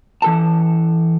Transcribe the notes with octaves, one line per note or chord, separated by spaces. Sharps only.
E3 A4 A5